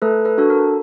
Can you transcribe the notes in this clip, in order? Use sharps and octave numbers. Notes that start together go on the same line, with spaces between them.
A3 A4 B4
A4 B4
D4 F#4 A4
A#4